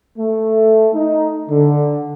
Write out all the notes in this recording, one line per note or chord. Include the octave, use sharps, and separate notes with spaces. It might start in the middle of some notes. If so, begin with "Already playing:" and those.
A3
D#4
D3